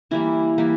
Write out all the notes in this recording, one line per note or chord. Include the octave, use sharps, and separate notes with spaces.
E3 G3 A#3 E4
E3 G3 A#3